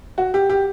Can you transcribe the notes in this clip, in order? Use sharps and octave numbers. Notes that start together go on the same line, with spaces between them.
F#4
G4
G4